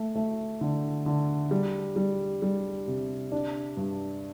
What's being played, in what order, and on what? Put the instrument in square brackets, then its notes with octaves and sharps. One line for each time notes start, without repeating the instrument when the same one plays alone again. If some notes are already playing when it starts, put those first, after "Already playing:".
Already playing: [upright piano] A3
A3
D3
D3
G3
G3
G3
C3
D4
G2